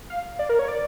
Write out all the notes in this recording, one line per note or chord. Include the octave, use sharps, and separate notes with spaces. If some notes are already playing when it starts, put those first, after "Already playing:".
F5
D5
A#4
C#5
D5